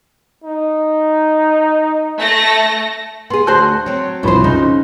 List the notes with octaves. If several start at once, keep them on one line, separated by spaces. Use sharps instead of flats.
D#4
A3 A5 A#6
B3 G#4 C6
D2 F#4 C5 A5 F#6 G6
F#3 C4
C2 B2 F3 C5 B5
C#3 D#4